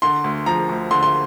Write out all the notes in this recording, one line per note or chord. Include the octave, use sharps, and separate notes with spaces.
D3 C6
D2
F3 A#5
D2
D3 C6
C6